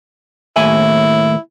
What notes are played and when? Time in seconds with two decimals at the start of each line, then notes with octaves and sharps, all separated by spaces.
0.56 D#2 A2 E4 G#5